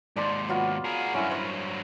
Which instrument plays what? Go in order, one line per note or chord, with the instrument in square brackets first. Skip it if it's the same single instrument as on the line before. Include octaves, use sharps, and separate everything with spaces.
[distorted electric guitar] D#2 G#2 [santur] D5 A5 C6
[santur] F#3 B3 F4
[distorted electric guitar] G#4 A#4
[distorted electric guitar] G2 F#3 [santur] C#4 E4 A#4
[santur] C5 C#5 D#6